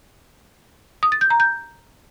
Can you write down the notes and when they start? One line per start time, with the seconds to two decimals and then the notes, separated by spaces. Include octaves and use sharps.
1.03 D#6
1.12 A6
1.21 G6
1.30 A#5
1.40 G6